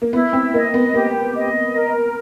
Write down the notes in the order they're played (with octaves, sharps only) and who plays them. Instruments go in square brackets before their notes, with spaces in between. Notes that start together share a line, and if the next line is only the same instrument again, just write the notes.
[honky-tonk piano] A#3
[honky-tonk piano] B3 [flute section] E4
[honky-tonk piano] C4
[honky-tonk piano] A#3 [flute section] D#5
[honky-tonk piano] B3
[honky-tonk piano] A#3 [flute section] G4
[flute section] D#5
A#4